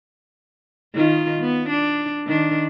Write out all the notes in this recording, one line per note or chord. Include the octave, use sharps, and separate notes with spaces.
D#3 D#4 F4
B3
D4
D#3 D4